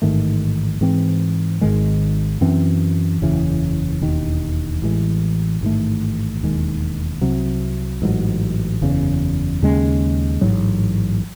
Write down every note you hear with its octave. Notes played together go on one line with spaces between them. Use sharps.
A1 G#2 D#3 A3
G#2 E3 C4
G#1 G#2 D#3 G#3
F#2 E3 C4
F#1 E2 C#3 E3
E1 D#2 D#3
A1 A2 E3 G#3
A1 G#2 D#3 A3
E1 D#2 D#3 G#3
C2 C3 F#3
A1 G#2 F#3
F#1 E2 C#3
D#2 C#3 G#3 C#4
A1 G#2 F#3